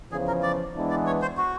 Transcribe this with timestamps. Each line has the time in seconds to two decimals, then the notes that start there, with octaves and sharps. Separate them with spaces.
0.11 E2 C#3 F3 G#4
0.28 A#4
0.43 D5
0.75 E3 G#3 B3 D4
0.90 D5
1.07 C#5
1.22 C5
1.37 F#4